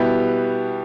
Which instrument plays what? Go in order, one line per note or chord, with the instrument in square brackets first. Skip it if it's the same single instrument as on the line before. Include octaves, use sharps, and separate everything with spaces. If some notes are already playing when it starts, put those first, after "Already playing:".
Already playing: [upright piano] B2 G3 B3 E4 G4